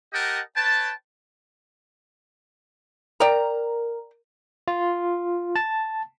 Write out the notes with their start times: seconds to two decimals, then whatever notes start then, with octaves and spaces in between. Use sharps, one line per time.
0.13 G4 A#4 D#5 F#5 G5 A5
0.56 B4 C#5 G5 A5
3.20 A#4 D5 G5 A#5
4.68 F4
5.56 A5